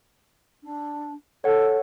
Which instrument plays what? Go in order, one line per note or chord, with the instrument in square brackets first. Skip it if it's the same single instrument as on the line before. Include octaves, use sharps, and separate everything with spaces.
[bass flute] D4
[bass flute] A4 [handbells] C#5 F#5